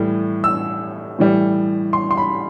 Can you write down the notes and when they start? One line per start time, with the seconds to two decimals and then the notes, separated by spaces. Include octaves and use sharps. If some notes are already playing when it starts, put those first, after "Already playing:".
Already playing: A2 E3 G3
0.44 E6
1.19 A2 E3 G3
1.93 C6
2.11 C6
2.17 B5